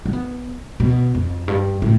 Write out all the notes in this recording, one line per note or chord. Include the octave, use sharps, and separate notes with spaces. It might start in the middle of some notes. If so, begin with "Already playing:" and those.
C4
B3
B2
F2
G2
A2